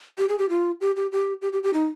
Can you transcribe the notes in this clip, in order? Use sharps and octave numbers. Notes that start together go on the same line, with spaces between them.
G4
G#4
G4
F4
G4
G4
G4
G4
G4
G4
D#4